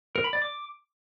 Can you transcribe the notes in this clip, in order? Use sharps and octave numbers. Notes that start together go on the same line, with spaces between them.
A#4
B5
D5
D6